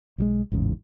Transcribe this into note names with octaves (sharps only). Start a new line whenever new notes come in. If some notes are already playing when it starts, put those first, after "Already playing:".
B1 F3 G#3
A1 E2 G#2 C#3